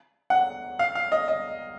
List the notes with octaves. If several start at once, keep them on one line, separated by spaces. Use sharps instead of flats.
F#5
F5
F5
D#5
D#5